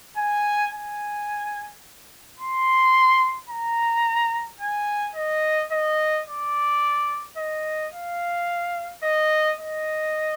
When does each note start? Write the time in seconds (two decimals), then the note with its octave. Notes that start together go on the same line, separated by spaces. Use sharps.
0.17 G#5
0.73 G#5
2.39 C6
3.49 A#5
4.60 G#5
5.15 D#5
5.72 D#5
6.27 D5
7.37 D#5
7.94 F5
9.04 D#5
9.59 D#5